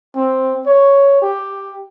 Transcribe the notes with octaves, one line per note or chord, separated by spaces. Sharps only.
C4
C#5
G4